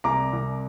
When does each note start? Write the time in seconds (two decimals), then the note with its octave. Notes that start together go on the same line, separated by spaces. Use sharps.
0.04 C2 A#5 D6
0.33 C2